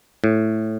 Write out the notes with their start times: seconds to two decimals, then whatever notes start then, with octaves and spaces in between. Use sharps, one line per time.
0.24 A2